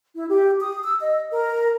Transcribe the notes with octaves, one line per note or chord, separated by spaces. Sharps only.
E4
G4
D#6
E6
D#5
A#4